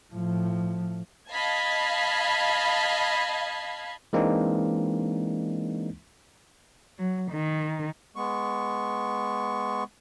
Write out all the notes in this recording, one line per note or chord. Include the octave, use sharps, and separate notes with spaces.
A2 F3
D#5 F5 A5 B5 G#6
E3 G#3 A#3 C4 D4 D#4
F#3
D#3
G#3 B3 C#6